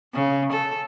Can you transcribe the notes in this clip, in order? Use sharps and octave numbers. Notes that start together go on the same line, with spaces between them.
C#3
A4